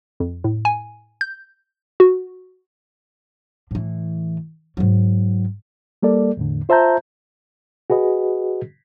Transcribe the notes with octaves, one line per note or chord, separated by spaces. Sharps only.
F2
A2
G#5
G6
F#4
A2 E3
G#2 F#3
G3 A#3 A4 D5
E2 A2 D3
F4 C5 E5 A5 A#5 G6
F#4 G#4 B4 D#5